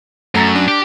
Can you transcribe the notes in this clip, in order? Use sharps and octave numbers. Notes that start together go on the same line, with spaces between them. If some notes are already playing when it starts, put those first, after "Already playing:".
F#2 A3 A#5 A6
D4
G4